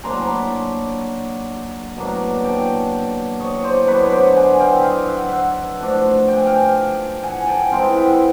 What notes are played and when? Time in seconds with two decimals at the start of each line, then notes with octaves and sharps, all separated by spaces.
0.04 F#3 A#3 D4 A#5 C6
0.21 A#5
0.28 A5 B5
1.96 B2 F#3 A#3 D4
2.44 G5 A5
3.40 C#5 D#5
3.64 C5 D5
3.88 D3 F#3 B3 D4 B4 C#5
4.03 C#5
4.12 C5 D5
4.36 F#5 G#5
4.59 F5 G5
4.74 E5
4.84 D#5 F5
5.08 E5 F#5
5.32 E5 F#5
5.79 F3 A3 D4
6.28 G5
6.37 G#5
6.46 F5 G5
7.23 F#5 G#5
7.47 G5 A5
7.71 E3 G#3 C4 F5 G5
7.95 E5 F#5
8.08 E5